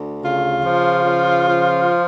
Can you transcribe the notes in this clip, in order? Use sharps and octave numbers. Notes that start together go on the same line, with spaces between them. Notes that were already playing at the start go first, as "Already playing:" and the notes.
Already playing: D2
C#3 F4
F3
C#3
F3